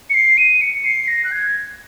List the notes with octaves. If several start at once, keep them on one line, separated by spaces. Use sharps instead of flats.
C#7
C7
D#7
C#7
C7
A#6
F#6
G#6